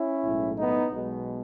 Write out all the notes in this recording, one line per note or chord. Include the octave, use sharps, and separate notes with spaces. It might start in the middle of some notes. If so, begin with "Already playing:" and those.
Already playing: C#4 E4
B1 A2 G#3
B3 D#4
B1 B2 G#3